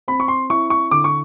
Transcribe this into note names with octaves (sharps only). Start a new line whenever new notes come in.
C4 B5
C#6
C6
E4 C#6
C#6
D3 D6
C#6